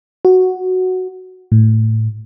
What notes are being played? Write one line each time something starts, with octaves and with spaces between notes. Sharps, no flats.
F#4
A2